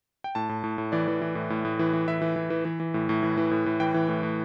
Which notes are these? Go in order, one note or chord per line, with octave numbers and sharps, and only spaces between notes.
G5
A2 A5
A2
A2
A2
E3 D5
E3
E3
A2
A2
A2
E3
E3
E3 E5
E3
E3
E3
E3
E3
A2
A2
E3
E3
A2
A2
E3 G5
E3
A2
A2